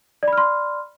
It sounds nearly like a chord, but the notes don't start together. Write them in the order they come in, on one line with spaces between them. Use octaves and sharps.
D5 B5 F6 C6